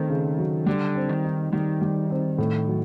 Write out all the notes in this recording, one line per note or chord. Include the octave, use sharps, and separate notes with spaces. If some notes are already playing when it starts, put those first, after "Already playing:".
Already playing: D#3 A3 C4
C#3
F#3
D3 G3
C4
D#3
D#4
D#3 G3
G3
C4
A2
F#3